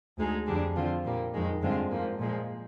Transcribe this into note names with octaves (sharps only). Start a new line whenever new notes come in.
D2 D3 G#3 D#4 G#4
F2 D3 G3 D4 G#4
D3 F3 C4 F4
A#2 G3 A#3
F2 D#3 G#3
G2 D3 G#3 C4 F4
G#2 F3 A#3
A#2 F3 G#3